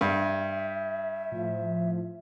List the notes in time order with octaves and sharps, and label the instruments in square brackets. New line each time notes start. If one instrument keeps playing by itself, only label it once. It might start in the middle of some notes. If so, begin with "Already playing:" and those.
[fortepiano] G2 [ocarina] E5
[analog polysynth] A2 F3